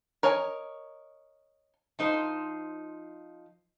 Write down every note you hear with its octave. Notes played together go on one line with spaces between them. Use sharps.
A#4 C#5 D#5 G#5
F3 D#4 C5